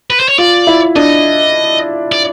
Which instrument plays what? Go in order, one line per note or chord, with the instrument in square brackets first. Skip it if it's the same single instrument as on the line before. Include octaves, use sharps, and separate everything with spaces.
[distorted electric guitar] B4
C5
C#5
[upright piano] F4 [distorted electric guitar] D5
[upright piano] E4
[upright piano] D4 [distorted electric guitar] D#5
[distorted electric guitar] D5